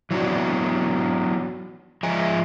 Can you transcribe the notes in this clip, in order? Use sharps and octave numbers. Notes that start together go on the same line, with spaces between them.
E3 F#3 B3 D4 F#4
F3 G#3 E5 G#5 A#5